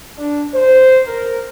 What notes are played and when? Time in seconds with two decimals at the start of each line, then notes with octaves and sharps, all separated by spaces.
0.18 D4
0.54 C5
1.07 A#4